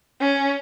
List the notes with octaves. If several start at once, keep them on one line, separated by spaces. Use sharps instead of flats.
C#4